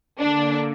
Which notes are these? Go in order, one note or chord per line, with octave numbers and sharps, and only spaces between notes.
D3 A#3 D4